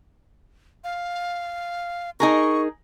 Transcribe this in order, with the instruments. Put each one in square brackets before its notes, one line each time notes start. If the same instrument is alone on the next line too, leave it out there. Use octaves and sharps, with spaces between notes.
[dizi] F5
[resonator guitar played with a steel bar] D#4 G#4 A#4 [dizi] C#6